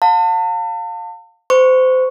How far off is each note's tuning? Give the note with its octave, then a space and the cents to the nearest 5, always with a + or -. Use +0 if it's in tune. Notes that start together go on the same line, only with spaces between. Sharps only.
F5 +30 A5 +40
C5 -25 C#6 +0